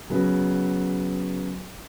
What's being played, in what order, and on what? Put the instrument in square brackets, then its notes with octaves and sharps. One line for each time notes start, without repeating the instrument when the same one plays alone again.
[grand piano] C#3 F#3 B3